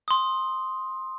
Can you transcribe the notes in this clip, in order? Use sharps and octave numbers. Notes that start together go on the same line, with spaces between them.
C6 D#6